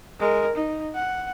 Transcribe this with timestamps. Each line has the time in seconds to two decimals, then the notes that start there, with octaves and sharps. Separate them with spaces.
0.20 G#3 A#4
0.56 D#4
0.95 F#5